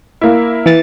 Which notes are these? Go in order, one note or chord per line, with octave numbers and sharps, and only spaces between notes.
A#3 E4
E3 A6